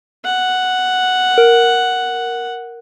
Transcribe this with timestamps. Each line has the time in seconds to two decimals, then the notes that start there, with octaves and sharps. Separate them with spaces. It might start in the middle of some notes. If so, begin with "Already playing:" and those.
0.25 F#5
1.38 A#4